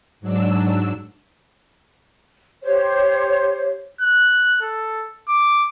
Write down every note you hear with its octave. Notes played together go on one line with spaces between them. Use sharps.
G#2 F#3 D4 E6
G4 C5 C#5
F#6
A4
D6